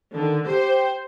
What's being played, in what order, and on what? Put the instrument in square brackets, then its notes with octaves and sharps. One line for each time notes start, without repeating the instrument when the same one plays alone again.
[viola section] D3 [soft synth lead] D#3
[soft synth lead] G4 [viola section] C5